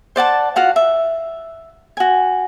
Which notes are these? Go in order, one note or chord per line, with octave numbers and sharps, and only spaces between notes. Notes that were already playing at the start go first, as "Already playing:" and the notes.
C5 D5 F#5 A5
F4 F#4 F5 F#5
E5
F#4 G#5